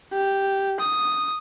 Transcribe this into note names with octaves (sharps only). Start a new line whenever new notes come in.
G4
D#6